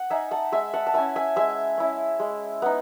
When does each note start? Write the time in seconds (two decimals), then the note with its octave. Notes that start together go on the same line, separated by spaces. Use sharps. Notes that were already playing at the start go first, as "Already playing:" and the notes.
Already playing: F#5
0.10 D#4 E5 G#5
0.31 F#5 A5
0.52 G#3 E5 G#5
0.74 F#5 A5
0.87 A5
0.94 C#4 E4 E5 G#5
1.16 E5 G#5
1.36 G#3 E5 G#5
1.78 C#4 E4
2.20 G#3
2.62 B3 D#4